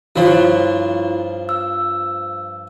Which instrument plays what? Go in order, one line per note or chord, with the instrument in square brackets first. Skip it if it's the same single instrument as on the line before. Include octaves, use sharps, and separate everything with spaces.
[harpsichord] G2 F3 [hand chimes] E4 F4 C#5
[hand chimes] E6